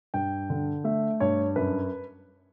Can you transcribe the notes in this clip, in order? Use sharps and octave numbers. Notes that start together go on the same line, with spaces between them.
G2 G5
D3
A3 E5
G2 C#5
F#2 B4